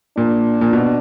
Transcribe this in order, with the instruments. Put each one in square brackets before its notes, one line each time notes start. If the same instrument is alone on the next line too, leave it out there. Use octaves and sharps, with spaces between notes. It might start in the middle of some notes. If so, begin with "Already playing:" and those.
[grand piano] A#2 [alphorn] D4
[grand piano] A#2
B2